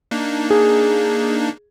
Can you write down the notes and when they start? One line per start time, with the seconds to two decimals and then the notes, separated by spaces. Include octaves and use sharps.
0.11 A#3 D4 D#4
0.50 G#4